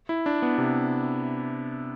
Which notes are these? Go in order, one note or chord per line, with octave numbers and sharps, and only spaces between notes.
E4
D4
B3
C3